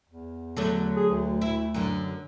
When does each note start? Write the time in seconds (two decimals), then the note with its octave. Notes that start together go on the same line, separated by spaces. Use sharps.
0.09 E2
0.57 D3 F#3 A3
0.96 G#4
1.09 D2
1.41 E4
1.74 F#2 D3